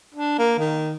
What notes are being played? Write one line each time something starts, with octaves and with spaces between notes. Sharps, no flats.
D4
A#3
D#3